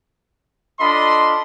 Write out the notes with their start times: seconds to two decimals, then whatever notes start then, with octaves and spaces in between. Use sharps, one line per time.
0.80 D4 F4 A4 D#5 B5 C6